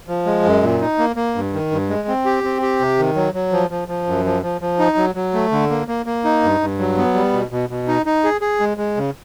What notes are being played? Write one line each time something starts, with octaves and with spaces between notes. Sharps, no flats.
F3
G#3
F#2
A#2
D#4
A#3
A#3
G2
D#3
G2
G#3
C4
G4
C4
G4
C3
D#3
F#3
F#3
F3
F3
F3
F#2
F3
F3
F3
D#4
F#3
F#3
A3
D3
A#3
A#3
A#3
D#4
G2
G2
F#3
B3
G3
B2
B2
B2
D#4
D#4
G#4
G#4
G#3
G#3
C#3